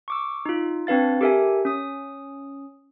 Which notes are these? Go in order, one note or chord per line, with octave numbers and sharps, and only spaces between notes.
C#6 D6 E6
D#4 F4
C4 D4 B4 F5 A6
G4 A4 A#4 E5 G#5
C#4 D#6